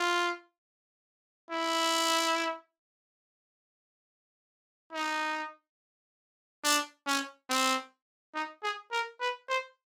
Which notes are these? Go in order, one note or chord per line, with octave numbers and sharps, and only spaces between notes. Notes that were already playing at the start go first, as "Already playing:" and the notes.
Already playing: F4
E4
D#4
D4
C#4
C4
D#4
G#4
A#4
B4
C5